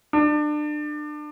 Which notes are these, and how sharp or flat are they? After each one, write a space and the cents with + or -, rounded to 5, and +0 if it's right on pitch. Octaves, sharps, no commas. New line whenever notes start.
D4 +30